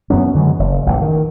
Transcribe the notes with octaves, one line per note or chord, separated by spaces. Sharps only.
F#2 F#3 B3 C#4
D3 E3 F#3 G#3
F#1
A1 F2 E3
D#3